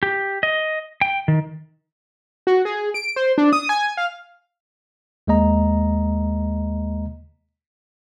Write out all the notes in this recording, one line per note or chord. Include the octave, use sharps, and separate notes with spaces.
G4
D#5
G5
D#3
F#4
G#4
D7
C5
D4
D#6
G#5
F5
D#2 G#3 A#3 D#5 A#5